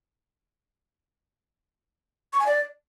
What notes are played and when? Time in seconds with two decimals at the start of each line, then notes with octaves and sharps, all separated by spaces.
2.33 C#6
2.40 G#5
2.46 D5